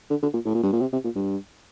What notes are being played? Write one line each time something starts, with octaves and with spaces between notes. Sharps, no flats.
D3
D3
A#2
A2
A#2
G2
A#2
C3
C3
A#2
G2